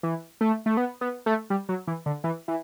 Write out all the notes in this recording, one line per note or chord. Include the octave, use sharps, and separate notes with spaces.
E3
A3
A3
B3
B3
A3
G3
F#3
E3
D3
E3
E3